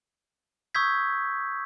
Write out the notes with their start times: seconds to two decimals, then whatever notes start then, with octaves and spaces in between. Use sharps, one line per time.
0.75 C#6 D#6 E6 G6 G#6 B6